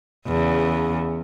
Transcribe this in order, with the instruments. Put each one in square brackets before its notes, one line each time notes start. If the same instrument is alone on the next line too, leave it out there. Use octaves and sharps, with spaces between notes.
[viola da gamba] E2 C#3